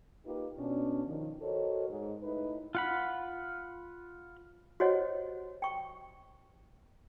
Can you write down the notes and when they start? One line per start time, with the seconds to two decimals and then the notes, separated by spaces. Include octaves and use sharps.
0.25 A#3 D#4 F4 G4 B4
0.58 B2 C#4 D4
1.06 D#3 F3
1.42 F#4 A4 A#4 C5 C#5 D#5
1.89 G#2
2.23 A2 D#4 E4 B4
2.75 F4 F#5 B5
4.80 F#4 G4 C5 C#5 D#5 F#5
5.62 G5 C#6